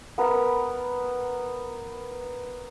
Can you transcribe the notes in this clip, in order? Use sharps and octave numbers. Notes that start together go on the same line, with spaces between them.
B3 A#4